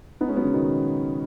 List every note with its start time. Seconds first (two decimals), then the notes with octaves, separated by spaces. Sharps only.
0.21 B3 D#4
0.28 G#3 C#4
0.36 F#3 B3
0.44 C#3
0.53 B2 D#3